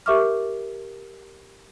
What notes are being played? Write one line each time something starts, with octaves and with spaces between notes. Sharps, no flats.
G4 A#4 E5 C#6 D6 F6